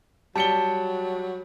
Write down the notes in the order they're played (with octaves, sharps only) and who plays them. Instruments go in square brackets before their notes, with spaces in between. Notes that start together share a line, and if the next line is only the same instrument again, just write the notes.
[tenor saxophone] F#3 [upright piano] G3 C#7 G7 [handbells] A5